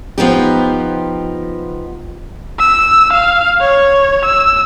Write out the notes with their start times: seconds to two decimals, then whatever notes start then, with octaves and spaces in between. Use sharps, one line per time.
0.18 F3 B3 D#4 G4
2.59 E6
3.13 F5
3.61 C#5
4.25 E6